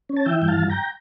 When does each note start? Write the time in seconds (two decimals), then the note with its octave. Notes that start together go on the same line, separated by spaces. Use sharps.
0.09 C#4
0.17 A5
0.25 E3 E5 G5
0.42 G2 G5
0.48 F5 A5
0.58 G2
0.70 G5 A#5